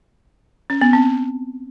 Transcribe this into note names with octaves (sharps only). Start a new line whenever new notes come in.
C#4
B3
C4